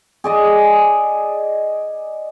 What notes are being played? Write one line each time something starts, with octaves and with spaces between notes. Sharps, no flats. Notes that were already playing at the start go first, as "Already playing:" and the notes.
G#4 D5 D#5